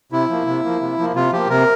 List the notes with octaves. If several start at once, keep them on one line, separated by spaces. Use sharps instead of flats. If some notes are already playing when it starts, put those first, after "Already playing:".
C3 E4
F3 A#3
C3
F3 A#3
C3
F3 A#3
C3 F4
F3 A#3 G4
C3 A#4